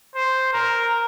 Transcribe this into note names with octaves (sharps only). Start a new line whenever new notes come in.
C5
A#4